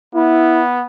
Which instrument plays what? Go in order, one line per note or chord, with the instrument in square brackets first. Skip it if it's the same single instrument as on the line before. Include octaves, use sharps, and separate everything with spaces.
[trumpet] B3 [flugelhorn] E4